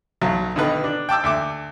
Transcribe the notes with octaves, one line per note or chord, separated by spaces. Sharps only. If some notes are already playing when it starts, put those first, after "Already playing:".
B1 F#3
B2 D3 D#3 D#4 B4
D4
G5 A5 D6 E6
D2 E5 D6